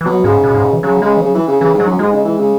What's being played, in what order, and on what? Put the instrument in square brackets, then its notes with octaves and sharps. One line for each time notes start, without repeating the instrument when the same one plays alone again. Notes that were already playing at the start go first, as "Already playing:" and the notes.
[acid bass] E3
[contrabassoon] B2 [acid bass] F#3
[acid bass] G#2 [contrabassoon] C#3
[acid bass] B2
G#2
B2
E3
[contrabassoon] C#3 [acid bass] F#3
[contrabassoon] C#3 [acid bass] G#3
[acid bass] E3
[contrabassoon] C#3 [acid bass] F#3
[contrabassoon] E3
C#3
[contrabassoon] C#3 [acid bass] E3
[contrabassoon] G#2
[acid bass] F#3
[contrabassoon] F#2
[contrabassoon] G#2 [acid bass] G#3
[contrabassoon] C#3
E3
C#3